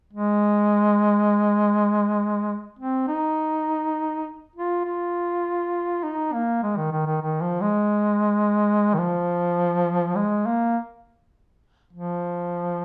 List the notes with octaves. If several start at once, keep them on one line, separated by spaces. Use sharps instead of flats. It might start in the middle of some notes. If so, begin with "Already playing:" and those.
G#3
C4
D#4
F4
F4
D#4
A#3
G#3
D#3
D#3
D#3
D#3
F3
G#3
D#3
F3
G#3
A#3
F3